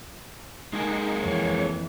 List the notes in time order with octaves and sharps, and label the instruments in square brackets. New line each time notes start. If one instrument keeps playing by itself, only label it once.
[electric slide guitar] G#3 A#3 G#4 [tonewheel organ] D#4
[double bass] F2 E3 [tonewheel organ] C#5